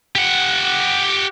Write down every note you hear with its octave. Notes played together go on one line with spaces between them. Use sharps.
G4 F#5